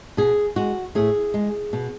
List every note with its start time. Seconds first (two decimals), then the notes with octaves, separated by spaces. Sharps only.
0.17 B2 G#4
0.56 G#3 F#4
0.95 A2 G#4
1.34 G#3
1.73 B2